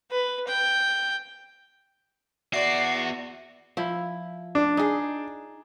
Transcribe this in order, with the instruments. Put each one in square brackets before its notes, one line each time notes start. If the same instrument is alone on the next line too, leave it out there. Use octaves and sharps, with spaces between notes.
[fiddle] B4
G5
[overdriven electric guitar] B3 E5 [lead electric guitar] F#4 [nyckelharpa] D5 [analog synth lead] C7
[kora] F3 E4
[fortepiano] D4
[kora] D#4 G#4